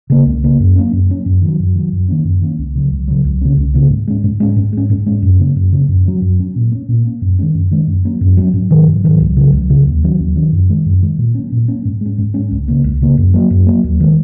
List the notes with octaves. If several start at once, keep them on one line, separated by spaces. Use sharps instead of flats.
C#3 A#3
C#2
C#3 A#3
F#2
F#3 A#3 C#4
F#2
F#3 A#3 C#4
F#2
D#3 F#3
F#2
D#3 F#3
F#2
D#3 A#3 C#4
F#2
D#3 A#3 C#4
C#2
C#3 F#3
C#2
C#3 F#3
C#2
C#3 A#3 C#4
C#2
C#3 A#3 C#4
G#2
G#3 C#4
G#2
G#3 C#4
G#2
G#3 C#4
G#2
G#3 C#4
F#2
C#3 A#3 C#4
F#2
C#3 A#3 C#4
F#2
F#3 C#4
F#2
F#3 C#4
A#2
A#3
C#4
A#2
A#3 C#4
F#2
D#3 G#3 C#4
F#2
D#3 G#3 C#4
F#2
F#3 A#3 C#4
F#2
F#3 A#3 C#4
G#2
D#3 F#3
G#2
D#3 F#3
C#2
C#3 F#3
C#2
C#3 F#3
D#2
D#3 F#3 C#4
D#2
D#3 F#3 C#4
F#2
D#3 G#3
F#2
D#3 G#3
A#2
F#3 A#3 C#4
A#2
F#3 A#3 C#4
G#2
G#3 C#4
G#2
G#3 C#4
C#2
C#3 A#3
C#2
C#3 A#3
F#2
F#3 A#3
F#2
F#3 A#3
D#2
D#3 G#3